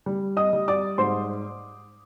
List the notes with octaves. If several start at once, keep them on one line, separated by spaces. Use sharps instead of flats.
G3
D#5 D#6
G3
D5 D6
G#2 C5 C6